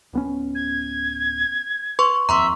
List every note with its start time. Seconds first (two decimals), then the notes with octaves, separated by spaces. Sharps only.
0.13 D1 B3 C#4
0.55 G#6
1.99 B4 C6 C#6
2.29 D#1 F2 E5 A#5 C6 C#6